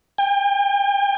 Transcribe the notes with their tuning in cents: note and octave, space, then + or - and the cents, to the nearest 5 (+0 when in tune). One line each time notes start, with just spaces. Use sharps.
G5 +40